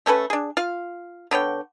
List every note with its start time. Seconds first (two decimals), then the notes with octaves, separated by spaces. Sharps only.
0.06 A3 C#4 A4 B4
0.30 D4 G#4
0.57 F4 F5
1.31 D3 B3 C#5 G5